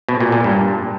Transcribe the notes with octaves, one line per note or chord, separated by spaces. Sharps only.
B2
A#2
A#2
G2